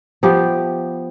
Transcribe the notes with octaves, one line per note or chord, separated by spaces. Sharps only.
F3 B3 G4